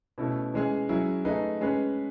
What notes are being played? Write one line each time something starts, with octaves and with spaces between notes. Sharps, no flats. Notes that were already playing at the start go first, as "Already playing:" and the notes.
B2 A3 C#4 E4
E3 G#3 C#4 G#4
F#3 C#4 E4 G#4
A3 D#4 G#4 B4
G#3 C#4 G#4 B4